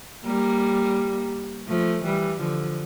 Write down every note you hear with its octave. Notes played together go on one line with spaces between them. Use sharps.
G3 A#3
F3 A3
E3 G3
D3 F3